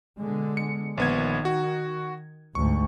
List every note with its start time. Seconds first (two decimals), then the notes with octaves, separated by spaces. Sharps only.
0.18 B2 D3 G#3
0.57 C#7
0.98 A#1 D#3 B3 G#6
1.45 F#4
2.55 A1 D2 G#2 C#6